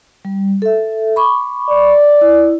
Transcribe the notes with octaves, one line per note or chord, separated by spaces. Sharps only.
G3
A4 E5
B5 C#6 D6
D5
E4